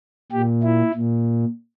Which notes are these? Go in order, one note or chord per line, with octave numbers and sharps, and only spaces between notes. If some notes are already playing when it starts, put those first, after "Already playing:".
A#2 G4
E4
A#2